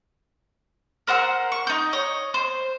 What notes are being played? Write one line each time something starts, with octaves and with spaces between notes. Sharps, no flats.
A#4 C5 F#5 E6
C#6
D#4 G6
C#5 D#5
C5